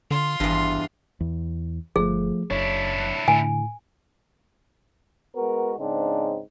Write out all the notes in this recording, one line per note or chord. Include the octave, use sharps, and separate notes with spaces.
D3 F4 C6
G#1 E2 G2
E2
G1 F3 A3 G#4
F#1 D4 E4 C#5
A2 D3 G#5
G#3 B3 F#4 A#4
G#2 C#3 C4 D4 D#4